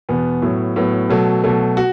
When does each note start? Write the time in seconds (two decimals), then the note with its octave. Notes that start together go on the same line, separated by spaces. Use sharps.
0.09 E2 B2 B3
0.42 A2 F#3 B3
0.76 A2 F#3 B3
1.10 B2 F#3 A3
1.44 B2 F#3 A3
1.77 F#4